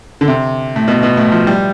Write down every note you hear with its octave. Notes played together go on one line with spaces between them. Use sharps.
D3
C3
A2
B2
B2
A2
F3
G3